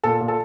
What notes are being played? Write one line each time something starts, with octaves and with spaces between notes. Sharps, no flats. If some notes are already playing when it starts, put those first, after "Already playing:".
A#2 A4
A#2
A4